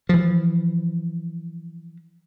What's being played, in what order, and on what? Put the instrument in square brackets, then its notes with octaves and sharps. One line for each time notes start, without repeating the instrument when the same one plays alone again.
[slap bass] E3 F3